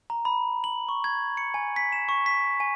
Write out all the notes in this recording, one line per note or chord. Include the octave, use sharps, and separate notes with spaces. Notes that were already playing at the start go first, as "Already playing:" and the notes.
A#5
B5
F#7
C#6
G#6
C#7
G#5
B6
E7
C#6
B6
G#5